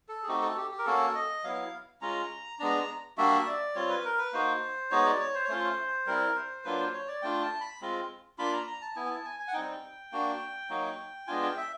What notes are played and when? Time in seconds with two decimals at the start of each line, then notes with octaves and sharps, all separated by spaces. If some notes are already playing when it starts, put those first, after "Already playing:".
0.09 A4
0.23 G#4
0.28 A3 C4 D#4 F#4 G4
0.42 A4
0.57 G4
0.71 G4
0.79 A#4
0.86 A#3 C#4 F#4 A4
1.15 D#5
1.44 F#3 B3 E4 F5
2.01 G#3 C#4 F4 A#5
2.59 G#3 B3 D4 A#5
3.17 G3 A#3 D4 F#4 E5
3.47 D5
3.75 G3 C4 F4 C#5
3.89 B4
4.04 A#4
4.19 B4
4.33 A#3 D#4 F#4 C5
4.91 G#3 B3 D#4 F#4 C#5
5.05 D5
5.20 C#5
5.34 C5
5.44 C#5
5.48 A3 C#4 F4 C5
6.06 G3 C4 E4 A#4
6.36 C5
6.64 F#3 A#3 D4 F4 B4
6.79 C5
6.93 C#5
7.08 D5
7.22 A3 D4 F4 G5
7.42 A5
7.61 B5
7.81 G#3 C4 F4
8.38 A#3 D4 F4 B5
8.53 A#5
8.67 A#5
8.82 A5
8.96 B3 E4 G#5
9.06 G#5
9.11 A5
9.25 G#5
9.40 G#5
9.48 F#5
9.53 G3 C4 D#4 G5
10.12 A#3 D4 F#4
10.69 F#3 A#3 D#4 F#4
11.27 G#3 B3 D4 F4 G#5
11.42 G5
11.57 E5